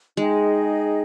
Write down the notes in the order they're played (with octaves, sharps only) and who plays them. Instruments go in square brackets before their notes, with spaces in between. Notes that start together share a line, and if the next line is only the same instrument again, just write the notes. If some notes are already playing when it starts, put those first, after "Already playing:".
[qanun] G#3 [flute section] D#4 G#4 D#5 G5